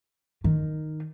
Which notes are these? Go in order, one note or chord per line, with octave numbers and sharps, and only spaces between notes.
D#3